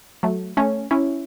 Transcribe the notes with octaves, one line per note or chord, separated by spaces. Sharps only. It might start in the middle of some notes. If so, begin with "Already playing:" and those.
F#3 A3
A3 C#4
C#4 E4